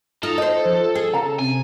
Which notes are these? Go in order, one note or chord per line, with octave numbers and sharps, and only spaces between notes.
D#4 F4 A4
D#4 C5 D#5
F3
G#4
C#3 F5 A#5
C3 G#5